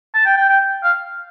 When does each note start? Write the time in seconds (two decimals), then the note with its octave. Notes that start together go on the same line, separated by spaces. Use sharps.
0.14 A5
0.26 G5
0.37 G5
0.49 G5
0.84 F5